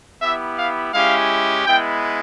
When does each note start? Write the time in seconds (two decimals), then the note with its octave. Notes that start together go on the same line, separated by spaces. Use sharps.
0.21 B3 E4 G4 E5
0.57 F5
0.93 G#3 C#4 E4 G4 F5
1.65 G#3 B3 E4 G5